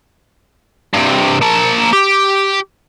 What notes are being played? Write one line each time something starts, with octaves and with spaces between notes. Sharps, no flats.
G2 C3
A#3 A5
G4